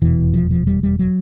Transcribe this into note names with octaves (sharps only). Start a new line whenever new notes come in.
F1 E2 B2 E3
F3
F3
G3
G3
F#3